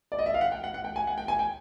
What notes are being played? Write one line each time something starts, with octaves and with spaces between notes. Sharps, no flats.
D5
D#5
E5
F5
F#5
G5
F#5
F#5
G5
G#5
F#5
G5
G#5
G5